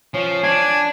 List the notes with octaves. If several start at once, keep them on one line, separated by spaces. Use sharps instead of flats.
F3 C#4
D4 G#5